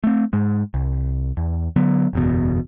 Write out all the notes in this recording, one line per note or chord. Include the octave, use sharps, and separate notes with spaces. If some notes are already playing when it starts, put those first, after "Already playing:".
A3 C4
G#2 G#3
C2
E2
D3 F#3 B3
F#1 E2 B2